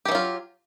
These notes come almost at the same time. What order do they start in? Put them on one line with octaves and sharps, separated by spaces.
G4 E3 F#3 F4